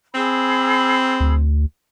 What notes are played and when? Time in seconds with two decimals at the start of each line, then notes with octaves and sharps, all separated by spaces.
0.14 C4 G#4 B5 E6
1.20 D2